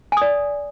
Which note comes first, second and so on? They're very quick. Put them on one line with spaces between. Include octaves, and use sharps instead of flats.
G#5 D#6 D5